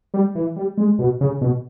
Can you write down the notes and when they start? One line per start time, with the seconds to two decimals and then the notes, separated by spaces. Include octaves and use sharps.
0.14 G3
0.35 E3
0.56 G3
0.78 G#3
0.99 B2
1.21 C#3
1.41 B2